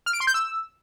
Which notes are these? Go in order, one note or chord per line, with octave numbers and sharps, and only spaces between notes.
F6
D7
C6
G6
E6